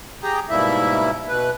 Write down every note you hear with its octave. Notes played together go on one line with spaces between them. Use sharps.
G4 G#4 G5 A#5
G#2 B2 G3 A#3 E4 E5
B2 B4